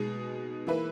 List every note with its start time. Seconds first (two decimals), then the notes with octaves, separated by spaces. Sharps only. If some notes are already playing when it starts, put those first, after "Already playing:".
Already playing: B2 G#3 D#4 G#4
0.67 E3 A#3 E4 B4